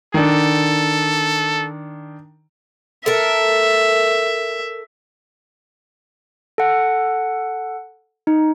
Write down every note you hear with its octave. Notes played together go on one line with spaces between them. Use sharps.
D#3 D4 A4
A4 A#4 E5
A4 F#5
D#4